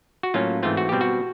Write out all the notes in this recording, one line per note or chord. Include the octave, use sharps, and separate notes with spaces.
F#4
A2 F#3 A#3 C#4 F4
G#2 E3 A3 C4 F4
F#4
B2 G3 C4 G4
F#4